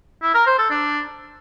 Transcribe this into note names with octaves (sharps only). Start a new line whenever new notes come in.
E4
A#4
C5
A4
D4